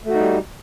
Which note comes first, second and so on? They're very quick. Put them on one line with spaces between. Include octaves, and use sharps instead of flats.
A3 F#4 D#4 G3